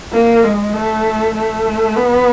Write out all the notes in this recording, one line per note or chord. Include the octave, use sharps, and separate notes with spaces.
A#3
G#3
A3
A3
B3